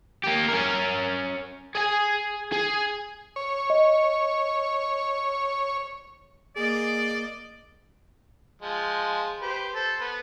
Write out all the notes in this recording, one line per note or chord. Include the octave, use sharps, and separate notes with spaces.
A#3 G4
C#4 A#4
G#4 G#5
G#4
C#5
D#5
A#3 G#4 D5 D#5
F3 G#3
G4 B4 C5
A4 C5
B3